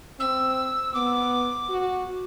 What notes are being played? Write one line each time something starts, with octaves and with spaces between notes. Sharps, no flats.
C4 E6
B3 D6
F#4